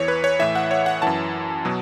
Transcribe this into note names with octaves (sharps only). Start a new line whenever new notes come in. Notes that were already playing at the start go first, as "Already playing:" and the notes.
Already playing: E2 E3 C#5
B4
C#5
A2 E3 E5
F#5
C#5
F#5
F#2 E3 A5
B2 F#3